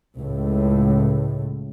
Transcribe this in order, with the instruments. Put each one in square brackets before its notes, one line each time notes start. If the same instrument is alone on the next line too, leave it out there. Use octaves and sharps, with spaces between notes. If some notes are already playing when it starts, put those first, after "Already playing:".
[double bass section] C#2 A2